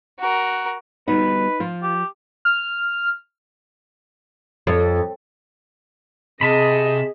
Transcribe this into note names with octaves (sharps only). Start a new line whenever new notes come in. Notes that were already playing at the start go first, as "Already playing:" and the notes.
F#4 A#4
G3 B3 D#4 F#4 B4
F3 F4
G4
F6
F2
C3 G#4 D#5 A5 B5